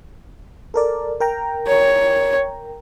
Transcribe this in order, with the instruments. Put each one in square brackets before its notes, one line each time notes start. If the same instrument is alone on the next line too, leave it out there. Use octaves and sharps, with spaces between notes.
[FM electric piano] A4 A#4 D5
A#4 G5 A#5
[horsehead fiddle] C#5